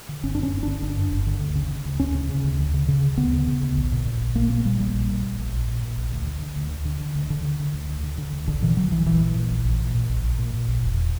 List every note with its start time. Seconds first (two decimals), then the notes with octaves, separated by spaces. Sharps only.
0.09 D3
0.23 G1 C#4
0.35 D4
0.38 F#2
0.43 C#4
0.53 G1
0.63 D3 D4
0.82 G1 D4
0.97 F#2
1.12 G1
1.26 D3
1.41 D2
1.56 C#3
1.70 C#3
1.85 D2
2.00 D2 C#4
2.15 C#3
2.29 C#3
2.44 D2
2.59 D2
2.74 C#3
2.88 C#3
3.03 D2
3.17 D2 B3
3.32 C#3
3.47 C#3
3.62 D2
3.76 A#1
3.91 A#2
4.06 A#2
4.21 A#1
4.35 A#1 A#3
4.50 A#2 A#3
4.65 A#2 G3
4.79 A#1 G3
4.94 A#1
5.09 A#2
5.24 A#2
5.38 A#1
5.53 A#1
5.67 A#2
5.83 A#2
5.97 A#1
6.12 D2
6.26 D3
6.41 D3
6.56 D2
6.71 D2
6.85 D3
7.01 D3
7.15 D2
7.30 D2 D3
7.44 D3
7.60 D3
7.74 D2
7.89 D2
8.03 D3
8.18 D3
8.33 D2
8.48 A#1 D3
8.62 A#2 E3
8.77 A#2 F#3
8.91 A#1 E3
9.06 A#1 E3
9.21 A#2
9.35 A#2
9.51 A#1
9.65 A#1
9.80 A#2
9.94 A#2
10.09 A#1
10.23 A#1
10.38 A#2
10.54 A#2
10.68 A#1
10.83 E1